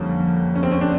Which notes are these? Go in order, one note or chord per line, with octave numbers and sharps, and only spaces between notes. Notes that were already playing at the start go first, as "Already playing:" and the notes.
Already playing: F2 D3 G3 A#3 C#4
C#4
C4
C#4
D4